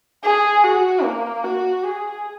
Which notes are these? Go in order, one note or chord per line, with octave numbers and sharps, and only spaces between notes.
G#4
F#4
A#3
F#4
G#4